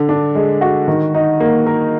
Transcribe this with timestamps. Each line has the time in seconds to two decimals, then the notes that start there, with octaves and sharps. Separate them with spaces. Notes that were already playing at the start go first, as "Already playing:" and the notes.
Already playing: D3
0.09 D4
0.35 G#3
0.61 F#4
0.88 D#3
1.14 D#4
1.40 A#3
1.67 A#4